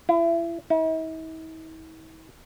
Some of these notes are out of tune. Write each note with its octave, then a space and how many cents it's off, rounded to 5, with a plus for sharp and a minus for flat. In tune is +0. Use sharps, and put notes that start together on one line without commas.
E4 +35
E4 -45